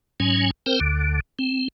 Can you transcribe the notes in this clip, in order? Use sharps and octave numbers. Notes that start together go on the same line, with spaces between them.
G#2 F#3 C#4 G#5
C4 A#4 C5 G5
D2 D3
C4